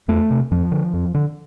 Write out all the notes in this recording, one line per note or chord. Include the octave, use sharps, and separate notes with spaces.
E2 A3
C3
F2 F3
D3
F2
D3